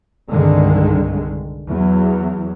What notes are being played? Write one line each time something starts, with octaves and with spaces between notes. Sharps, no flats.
C2 G2 D3 D#3 G#3
E2 F#3